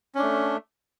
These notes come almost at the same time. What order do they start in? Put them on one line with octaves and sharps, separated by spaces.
C#4 D4 A3